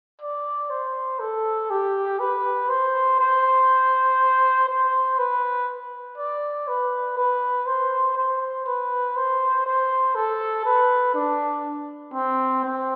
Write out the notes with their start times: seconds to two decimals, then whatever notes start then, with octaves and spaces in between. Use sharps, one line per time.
0.21 D5
0.70 C5
1.20 A4
1.70 G4
2.19 B4
2.69 C5
3.19 C5
4.69 C5
5.18 B4
6.18 D5
6.68 B4
7.17 B4
7.66 C5
8.17 C5
8.66 B4
9.17 C5
9.66 C5
10.15 A4
10.65 B4
11.15 D4
12.14 C4
12.64 C4